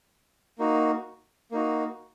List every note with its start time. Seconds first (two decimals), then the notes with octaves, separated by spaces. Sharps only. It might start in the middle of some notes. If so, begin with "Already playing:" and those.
0.59 A#3 D#4 F#4
1.52 A#3 D#4 F#4